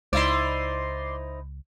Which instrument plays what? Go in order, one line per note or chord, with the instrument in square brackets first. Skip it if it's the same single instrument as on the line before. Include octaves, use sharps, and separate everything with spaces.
[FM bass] C#2 [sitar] D#4 E4 C5 [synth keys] D5 C6